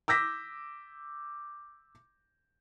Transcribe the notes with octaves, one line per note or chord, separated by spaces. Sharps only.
D6 E6 G6 A#6 B6